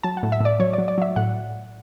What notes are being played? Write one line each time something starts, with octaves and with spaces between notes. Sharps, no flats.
F#3 A5
F#5
A2
E5
A2 D5
F#3 C#5
F#3 D5
D5
F#3 E5
A2 F#5